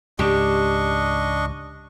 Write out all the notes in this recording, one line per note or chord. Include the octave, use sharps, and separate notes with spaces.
C#2 G#2 D4 G4 D#5 C#6